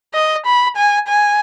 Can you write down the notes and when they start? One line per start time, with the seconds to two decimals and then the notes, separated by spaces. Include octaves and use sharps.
0.14 D#5
0.46 B5
0.77 G#5
1.08 G#5